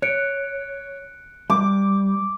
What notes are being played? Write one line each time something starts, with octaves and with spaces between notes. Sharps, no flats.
C#5 F#6 C#7 D7
G3 D6